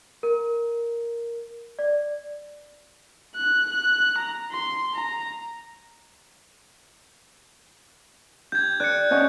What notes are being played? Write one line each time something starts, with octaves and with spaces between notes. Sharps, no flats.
A#4
D5
F#6
F#6
A#5
C6
A#5
G4 G6 G#6
D5 F#6 C#7
C#4 F#4 D#5